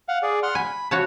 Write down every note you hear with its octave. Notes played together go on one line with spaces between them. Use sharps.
F5 F#5
G#4 D5
F#5 C6 F6
G#5 B5
F#4 C#5 A5